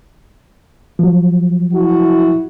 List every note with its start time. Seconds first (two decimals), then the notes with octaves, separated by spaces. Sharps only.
0.99 F3 F#3
1.73 E4 F#4